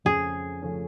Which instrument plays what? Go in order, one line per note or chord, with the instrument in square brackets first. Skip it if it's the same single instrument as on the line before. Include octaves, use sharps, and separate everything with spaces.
[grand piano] F2 C#3 F3 A3 C#4 [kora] G#4
[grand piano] C#3 F3 A3 C#4